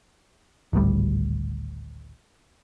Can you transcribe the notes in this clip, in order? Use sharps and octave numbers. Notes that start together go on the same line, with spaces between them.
D1 G#1 D2 G3